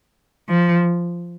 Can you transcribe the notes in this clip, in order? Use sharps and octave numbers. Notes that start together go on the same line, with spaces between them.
F3